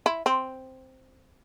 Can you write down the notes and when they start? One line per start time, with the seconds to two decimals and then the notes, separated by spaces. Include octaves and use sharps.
0.06 E4
0.26 C4